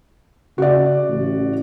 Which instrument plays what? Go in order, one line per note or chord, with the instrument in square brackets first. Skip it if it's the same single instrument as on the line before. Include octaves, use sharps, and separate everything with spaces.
[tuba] C#3 [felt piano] F#4 D5
[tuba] A1